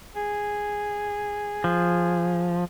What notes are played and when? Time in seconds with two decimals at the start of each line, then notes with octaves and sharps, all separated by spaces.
0.16 G#4
1.64 F3